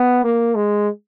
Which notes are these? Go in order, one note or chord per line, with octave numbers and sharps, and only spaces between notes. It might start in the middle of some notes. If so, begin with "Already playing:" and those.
Already playing: B3
A#3
G#3